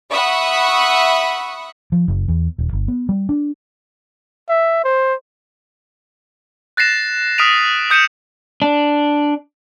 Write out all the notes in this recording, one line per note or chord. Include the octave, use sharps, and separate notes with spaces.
E5 F#5 B5 C#6 D#6
F3
F#1
E2
D#1
G1
B3
G3
D4
E5
C5
F#6 A6 A#6 C7 E7
D#6 F6 B6 D7 D#7 F7
D#6 G6 C#7 D#7 E7
D4